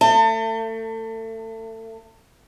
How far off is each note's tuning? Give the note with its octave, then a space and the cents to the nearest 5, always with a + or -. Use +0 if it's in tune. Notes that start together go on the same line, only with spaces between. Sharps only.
A3 +30 A5 +35